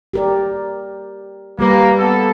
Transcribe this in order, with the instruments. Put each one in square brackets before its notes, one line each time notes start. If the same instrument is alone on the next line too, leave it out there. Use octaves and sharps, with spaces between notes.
[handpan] G4 A#4 D5
[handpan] G3 G4 B4 [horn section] A#3
[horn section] B3 A4